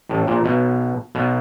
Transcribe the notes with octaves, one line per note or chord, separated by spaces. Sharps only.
A1 A2
A#1 A#2
B1 B2
B1 B2